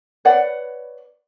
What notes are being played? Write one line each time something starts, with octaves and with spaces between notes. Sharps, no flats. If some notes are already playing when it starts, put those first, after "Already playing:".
B4 C#5 D5 F#5